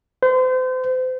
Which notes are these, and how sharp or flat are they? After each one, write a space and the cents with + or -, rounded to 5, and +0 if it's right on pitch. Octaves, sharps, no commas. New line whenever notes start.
C5 -35